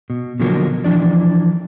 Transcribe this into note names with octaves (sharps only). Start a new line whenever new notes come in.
B2
B2 D3 F3 F#3 A#3
E3 F3 D4 D5